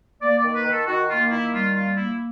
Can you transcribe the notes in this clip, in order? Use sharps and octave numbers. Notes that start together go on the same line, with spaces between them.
A#3 D5
D5
D#3
B4
D#3
A4
D#3 F#4
A#3 F4
D#3 E4
G3 F4
A#3 F4
A#3 E4